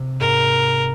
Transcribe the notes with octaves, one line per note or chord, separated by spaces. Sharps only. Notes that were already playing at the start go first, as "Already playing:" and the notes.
Already playing: C3
G#2 A#4